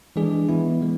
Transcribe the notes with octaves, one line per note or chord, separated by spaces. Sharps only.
E3 G#3 D4 G#4 D5
E3 B3 E4
E3 G#3